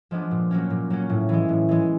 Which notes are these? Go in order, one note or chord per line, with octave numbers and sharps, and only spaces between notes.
F3 G#3 B3 D4
A#2
F#3 A#3 C#4
A#2
F#3 A#3 C#4
A2
E3 G#3
A2
E3 G#3